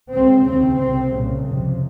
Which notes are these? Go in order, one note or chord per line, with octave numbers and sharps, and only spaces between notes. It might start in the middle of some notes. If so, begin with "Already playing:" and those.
C#2 C#3 C4
D#2 C#3 C4
C2 C3 C4
C2 A#2 C#3
F2 C3